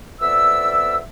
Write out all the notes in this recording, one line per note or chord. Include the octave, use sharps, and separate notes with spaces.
F2 B3 D5 E5 E6